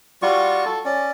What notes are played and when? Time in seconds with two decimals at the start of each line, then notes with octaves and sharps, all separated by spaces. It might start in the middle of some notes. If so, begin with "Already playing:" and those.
0.22 G3 F4 F#4 C#6
0.65 A4
0.85 C#4 D5